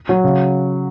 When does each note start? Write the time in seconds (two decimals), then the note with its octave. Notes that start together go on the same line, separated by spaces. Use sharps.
0.09 F#3
0.24 C#3